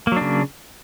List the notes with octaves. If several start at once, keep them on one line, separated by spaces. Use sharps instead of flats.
C#3 F#3 A#3 D4